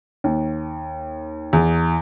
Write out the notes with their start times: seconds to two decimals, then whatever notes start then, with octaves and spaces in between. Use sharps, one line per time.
0.24 D#2
1.53 E2